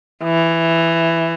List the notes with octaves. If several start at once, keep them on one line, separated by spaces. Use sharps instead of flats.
E3